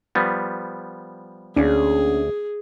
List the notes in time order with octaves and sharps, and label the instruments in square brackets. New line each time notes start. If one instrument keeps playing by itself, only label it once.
[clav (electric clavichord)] F3 G3 B3
[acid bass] D2 [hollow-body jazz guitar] A#3 C#4 D4 [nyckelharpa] G#4